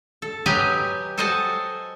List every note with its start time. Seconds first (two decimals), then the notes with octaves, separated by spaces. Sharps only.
0.22 A4
0.46 F#3 G4 B4 D#5 G#5 A#5
1.18 A4 C5 D#5 F#5 G#5 A5